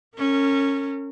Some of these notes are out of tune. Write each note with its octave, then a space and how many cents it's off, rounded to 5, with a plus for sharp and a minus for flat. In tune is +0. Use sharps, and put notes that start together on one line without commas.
C#4 -10 A#4 -40